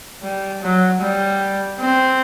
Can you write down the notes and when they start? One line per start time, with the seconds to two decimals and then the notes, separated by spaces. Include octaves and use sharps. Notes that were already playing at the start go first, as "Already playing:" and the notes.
0.22 G3
0.62 F#3
1.01 G3
1.79 C4